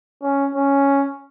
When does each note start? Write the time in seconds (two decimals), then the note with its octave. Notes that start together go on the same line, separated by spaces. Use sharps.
0.22 C#4
0.55 C#4